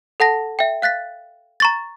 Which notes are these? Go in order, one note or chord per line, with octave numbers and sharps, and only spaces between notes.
A4 F#5 A5 A#6
E5 G5
F5 F#6 A6 B6
A#5 C#6 A6